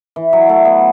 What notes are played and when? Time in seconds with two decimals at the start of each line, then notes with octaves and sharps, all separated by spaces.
0.16 E3
0.33 F#3
0.49 A3
0.65 B3